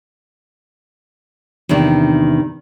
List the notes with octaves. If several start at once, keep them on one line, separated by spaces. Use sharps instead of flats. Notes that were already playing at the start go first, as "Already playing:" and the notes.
E2 C3 D#3 D4